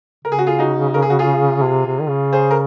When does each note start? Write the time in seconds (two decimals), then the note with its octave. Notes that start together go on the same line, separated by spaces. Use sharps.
0.25 C#3 A#4
0.32 G#4
0.39 F#4
0.46 F4 G#4
0.59 D#4 F#4
0.94 A#4
1.02 G#4
1.10 F#4
1.19 F4 G#4
1.63 C3
1.86 C3
2.01 D#3
2.09 C#3
2.33 G#4 C5
2.51 A#4